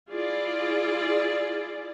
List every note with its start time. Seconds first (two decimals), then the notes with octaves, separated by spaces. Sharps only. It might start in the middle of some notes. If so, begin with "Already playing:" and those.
0.10 E4 F4 G#4 D5